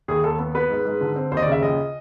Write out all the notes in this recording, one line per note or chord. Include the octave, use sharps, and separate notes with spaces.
D#2 G#4
D#2 A4
B3
B3 B4
G#2
G#2
D3
C4
D#2 C5
D#5
D5
C#3
E5
A#1 D#5